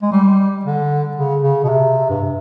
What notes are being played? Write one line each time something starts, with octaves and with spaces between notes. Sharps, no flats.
G#3
G3
D3
C#3
C#3
B2
C3
G2